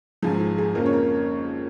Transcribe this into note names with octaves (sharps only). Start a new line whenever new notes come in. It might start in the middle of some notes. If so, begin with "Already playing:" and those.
G#1 G#2 F3 G#4
G#4
G#4
F2 C#3 A#3 C#4 A#4
C#5
A#4